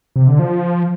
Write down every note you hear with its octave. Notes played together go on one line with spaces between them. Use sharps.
C3
D3
F3